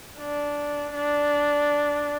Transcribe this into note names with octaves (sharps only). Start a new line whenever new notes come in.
D4
D4